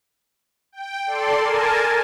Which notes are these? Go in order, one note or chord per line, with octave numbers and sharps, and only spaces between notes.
G5
A4 D5 C6
A#4 G#5 A5